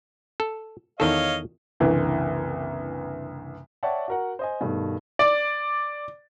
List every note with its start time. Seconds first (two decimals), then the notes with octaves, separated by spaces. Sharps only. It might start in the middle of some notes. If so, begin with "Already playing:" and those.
0.40 A4
1.00 E2 D#3 A4 C#5 D#5 F5
1.80 F#1 C2 D3 E3
3.83 C#5 D5 E5 F#5 G5 A5
4.08 F#4 A#4 F#5
4.39 C5 D#5 G#5
4.61 G2 B2 D#3 A3
5.19 D5